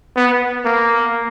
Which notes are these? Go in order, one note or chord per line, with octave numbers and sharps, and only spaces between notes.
B3
A#3